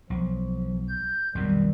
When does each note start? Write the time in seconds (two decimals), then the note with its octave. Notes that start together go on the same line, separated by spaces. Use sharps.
0.10 B1 F3
0.89 G6
1.35 B1 F2 C3 D#3 G3